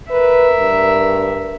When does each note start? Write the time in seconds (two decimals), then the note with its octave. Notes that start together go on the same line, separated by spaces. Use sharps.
0.10 A#4 B4 E5
0.59 G2